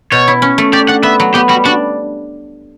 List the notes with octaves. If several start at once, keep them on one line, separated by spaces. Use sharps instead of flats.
B2 C#5
E4
C#4
A3
G4 D5
D4 F#5
B3 E5
F#3
B3 G4
G3 F#4
D4 F#4